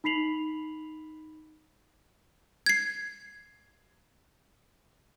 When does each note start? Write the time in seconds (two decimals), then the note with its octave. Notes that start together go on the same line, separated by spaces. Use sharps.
0.04 D#4 B5 B6 C7 F7 F#7
2.66 G#6 C7